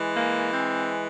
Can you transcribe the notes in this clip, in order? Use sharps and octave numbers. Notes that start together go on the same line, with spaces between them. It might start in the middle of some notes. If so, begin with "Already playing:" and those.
Already playing: E3 G#3
A#3
C4